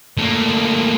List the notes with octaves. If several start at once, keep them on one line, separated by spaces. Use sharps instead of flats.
A2 A#3